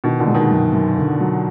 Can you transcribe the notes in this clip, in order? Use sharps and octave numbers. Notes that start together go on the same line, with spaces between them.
B2 D#3
A#2 D3
G#3
B2 D#3
F#2
F#2
D3
F#3